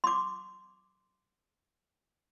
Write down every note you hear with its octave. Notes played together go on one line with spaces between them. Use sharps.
C6 D6